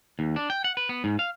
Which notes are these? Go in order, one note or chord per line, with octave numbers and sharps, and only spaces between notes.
D#2
D4
G5
F#5
B4
B3
G#2
F5